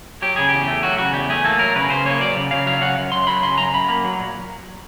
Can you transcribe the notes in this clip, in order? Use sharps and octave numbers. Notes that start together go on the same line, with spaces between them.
F#3 G4
C#3 G#4
E2 G4
A3
F#3 F#4
C#3 F#4
E2 G4
A3 G#4
A#3 A4
F#3 A#4
C#3 B4
C#3 C5
A#3 C#5
F#3 D5
C#3
C#3 F5
F#3 F5
C#3 F#5
F#2
F#2 C6
F#3 B5
C#3 C6
F#2 A#5
F#2 B5
A#3
F#3
A#2